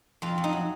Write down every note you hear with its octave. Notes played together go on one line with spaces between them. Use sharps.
F2 F4
F2
D#4
F#3